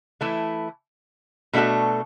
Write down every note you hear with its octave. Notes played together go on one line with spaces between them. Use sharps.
E3 A3 E4
B2 A3 D4 F#4 A4